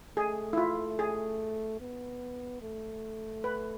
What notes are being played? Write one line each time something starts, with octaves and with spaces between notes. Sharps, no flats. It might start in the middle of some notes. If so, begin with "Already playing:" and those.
A3 G#4
E4
F4
G#4
B3
A3
B4